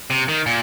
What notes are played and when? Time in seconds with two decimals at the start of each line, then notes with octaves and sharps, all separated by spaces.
0.10 C3
0.28 D#3
0.46 A#2